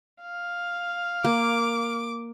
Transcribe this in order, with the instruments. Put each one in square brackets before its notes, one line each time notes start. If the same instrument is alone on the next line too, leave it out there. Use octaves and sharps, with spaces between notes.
[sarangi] F5
[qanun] A#3 [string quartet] D6